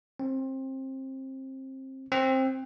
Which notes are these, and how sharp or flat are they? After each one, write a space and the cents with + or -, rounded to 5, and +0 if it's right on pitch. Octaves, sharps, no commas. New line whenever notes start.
C4 +25
C4 +15